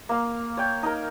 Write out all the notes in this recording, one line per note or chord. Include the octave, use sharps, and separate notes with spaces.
A#3 F5
C#5 G5
D#4 A#4